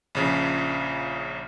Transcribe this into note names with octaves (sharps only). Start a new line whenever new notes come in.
A#1 C#3 F3